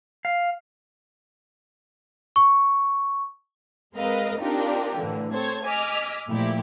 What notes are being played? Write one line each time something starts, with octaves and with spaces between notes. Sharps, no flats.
F5
C#6
G#3 C4 A#4 B4 D#5 F5
C4 D4 D#4 F4 G4 A#4
A2 D3 E3
C4 A4 C5 C#5 G#6
D#5 G#5 D6 E6 F6 B6
A#2 F3 A3 E4 G4